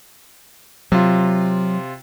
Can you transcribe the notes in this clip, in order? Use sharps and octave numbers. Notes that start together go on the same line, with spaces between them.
C3 F#3 F4